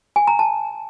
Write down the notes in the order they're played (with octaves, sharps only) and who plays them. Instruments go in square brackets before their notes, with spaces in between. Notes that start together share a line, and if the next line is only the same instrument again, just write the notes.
[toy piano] G#5
A#5
A5